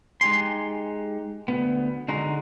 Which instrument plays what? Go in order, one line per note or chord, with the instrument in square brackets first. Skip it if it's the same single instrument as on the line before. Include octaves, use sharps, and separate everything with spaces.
[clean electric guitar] G#3 D#4 G4 G#5 C6
D2 B3
D3 G#3 D#4 F#4